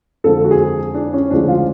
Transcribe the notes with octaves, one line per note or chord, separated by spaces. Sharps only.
F2 D3 F3 G#3 A4
F#4
G#4
D4
C#4
D2 C#3 F3 G#3 D4
F4